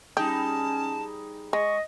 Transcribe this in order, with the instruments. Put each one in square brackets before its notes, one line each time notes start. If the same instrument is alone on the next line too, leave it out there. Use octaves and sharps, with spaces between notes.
[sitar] G3 D#4 G#4 [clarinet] C#4 [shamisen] G4 [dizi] A5
[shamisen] G#3 [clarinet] D#5 [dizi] C#6